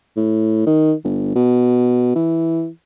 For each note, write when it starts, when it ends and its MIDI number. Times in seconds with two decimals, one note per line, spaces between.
0.17 0.66 45
0.67 0.93 51
1.05 1.33 31
1.35 2.13 47
2.16 2.68 52